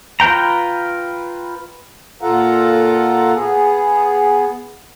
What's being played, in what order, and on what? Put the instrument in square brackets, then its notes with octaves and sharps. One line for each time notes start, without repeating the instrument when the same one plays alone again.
[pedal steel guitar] F4 B4 G5 A#5
[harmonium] A#2 F4 A4 F5 F#5 A#5
B3 G#4